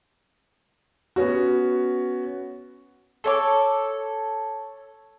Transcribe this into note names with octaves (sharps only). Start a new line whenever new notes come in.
B3 C#4 F#4
A4 C#5 D6